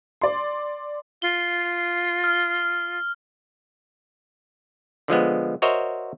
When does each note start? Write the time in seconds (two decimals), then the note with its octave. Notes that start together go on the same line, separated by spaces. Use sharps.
0.21 D5 C6
1.22 F4 G7
2.24 F6
5.08 D3 F3 G#3 B3
5.62 F#4 A#4 C5 C#5 D#5 E5